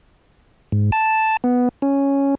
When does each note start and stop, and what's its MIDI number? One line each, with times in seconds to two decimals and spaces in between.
0.72 0.91 44
0.92 1.37 81
1.44 1.69 59
1.82 2.35 61